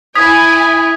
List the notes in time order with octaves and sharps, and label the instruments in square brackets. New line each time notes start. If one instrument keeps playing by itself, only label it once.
[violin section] E4 G#5 [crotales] D#6 G#6 B6